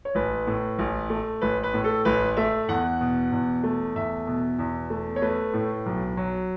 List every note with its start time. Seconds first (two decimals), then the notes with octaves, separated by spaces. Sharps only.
0.05 C#5
0.15 A1 B4
0.47 A2
0.79 A1
1.10 A3
1.41 A1 B4
1.63 B4
1.74 A2
1.84 A4
2.05 A1 B4
2.37 A3 E5
2.69 E2 F#5
3.01 B2
3.32 E2
3.63 A3
3.96 E2 E5
4.27 B2
4.59 E2
4.90 A3
5.16 C#5
5.22 A3 B4
5.54 A2
5.86 B1
6.17 F#3